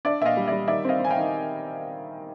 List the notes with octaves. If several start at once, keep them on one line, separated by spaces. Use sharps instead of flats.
D4 D5 E5
A#2 D#5 E5 F5
G3
G3 D5 E5
D#3 D5 E5
C4 D#5 F5
C4 G#5
F5 G5
D#3